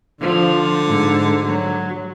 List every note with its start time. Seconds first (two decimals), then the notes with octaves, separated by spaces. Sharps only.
0.21 D3 F3
0.87 G#2
1.45 F#3